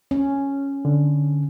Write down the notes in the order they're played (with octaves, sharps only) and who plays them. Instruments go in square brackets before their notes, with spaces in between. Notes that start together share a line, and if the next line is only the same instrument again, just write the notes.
[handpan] C#4
[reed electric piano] D3